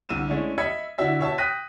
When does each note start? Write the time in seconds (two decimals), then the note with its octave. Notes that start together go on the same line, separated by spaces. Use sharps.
0.09 C2 D3 E6 D#7 E7
0.28 G#3 A3 C#4 D4 E4
0.58 D#5 E5 B5 G#6 C#7
0.98 D3 D4 E4 F#4 E5 B6
1.19 B2 C#5 E5 A5
1.38 G5 D#6 F#6 A#6 B6 D#7